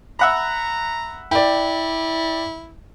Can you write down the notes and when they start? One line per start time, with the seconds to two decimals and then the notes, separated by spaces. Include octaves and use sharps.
0.19 E5 F#5 A#5 B5
1.31 E4 D5 G5